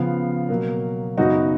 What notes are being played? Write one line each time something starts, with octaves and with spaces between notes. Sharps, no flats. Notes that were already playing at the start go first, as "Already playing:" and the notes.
Already playing: C#3 F3 B3 F5
B2 F#3 A#3
F#2 C#3 F#3 B3 D#4 F#4